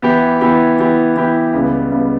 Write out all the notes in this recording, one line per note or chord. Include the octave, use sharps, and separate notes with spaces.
E3 B3 E4 G4
E3 B3 E4 G4
E3 B3 E4 G4
E3 B3 E4 G4
C#2 C#3 G3 B3
C#2 C#3 G3 B3